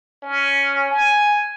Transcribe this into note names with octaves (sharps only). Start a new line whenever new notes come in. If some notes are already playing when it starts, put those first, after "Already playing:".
C#4
G#5